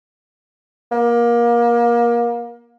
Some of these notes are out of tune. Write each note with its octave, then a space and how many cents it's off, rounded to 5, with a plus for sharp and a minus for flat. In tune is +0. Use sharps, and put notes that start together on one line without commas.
A#3 +25